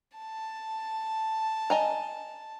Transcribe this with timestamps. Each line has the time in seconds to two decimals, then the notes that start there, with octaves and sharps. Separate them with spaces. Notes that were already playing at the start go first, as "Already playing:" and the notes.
0.18 A5
1.70 D#5 G#5 A#5